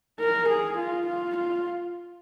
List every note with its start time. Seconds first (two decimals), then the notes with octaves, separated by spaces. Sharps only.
0.20 A#4
0.49 G#4
0.78 F4
1.07 F4
1.37 F4